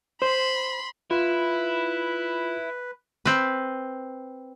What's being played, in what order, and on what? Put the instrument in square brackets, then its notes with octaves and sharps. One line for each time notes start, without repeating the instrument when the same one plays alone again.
[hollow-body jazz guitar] C5 [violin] B5 C6
[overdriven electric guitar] E4 [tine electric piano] F4 [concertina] B4
[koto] C4 B4